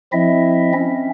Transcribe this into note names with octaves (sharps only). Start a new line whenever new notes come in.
F3 C4 E4 D#5 E5
C4 C#4